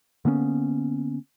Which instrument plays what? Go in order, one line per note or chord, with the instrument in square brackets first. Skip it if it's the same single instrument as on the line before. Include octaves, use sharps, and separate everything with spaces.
[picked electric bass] D3 A#3 B3 C#4